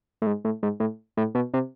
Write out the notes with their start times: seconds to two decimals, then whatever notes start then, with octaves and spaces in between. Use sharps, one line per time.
0.22 A2
0.27 G#2
0.45 A2
0.63 G#2
0.80 A2
1.17 A2
1.35 B2
1.54 C3